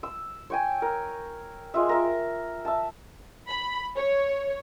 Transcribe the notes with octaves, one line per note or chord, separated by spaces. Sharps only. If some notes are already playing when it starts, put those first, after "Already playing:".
E6
C#5 G5 G#5
A#4
G#3 F4 E5
A#4 E5
E5 A5
B5
C#5